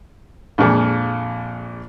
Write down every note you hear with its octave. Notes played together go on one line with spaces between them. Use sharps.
A#1 F2 A#2 G#3